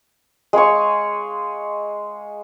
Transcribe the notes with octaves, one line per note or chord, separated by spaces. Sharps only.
G#3 F5 G#5 C#6